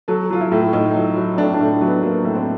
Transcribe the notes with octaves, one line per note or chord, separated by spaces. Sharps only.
F#3 A4
F#3 F4
E4
A2
A2 D#4
F#3
F#3
A2 D4
D4
A2
F#3
B3
F#3 A#3
A2
C4